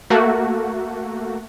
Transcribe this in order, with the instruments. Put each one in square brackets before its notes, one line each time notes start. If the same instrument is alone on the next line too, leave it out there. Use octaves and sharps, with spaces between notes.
[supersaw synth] A3 A#3 F#4